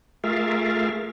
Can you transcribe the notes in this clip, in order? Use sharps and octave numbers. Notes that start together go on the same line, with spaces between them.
A3 F4 G#4 A#4 E5 F5